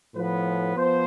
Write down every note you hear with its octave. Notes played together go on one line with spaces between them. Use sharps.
A2 F3 B3 B4
F3 B3 C5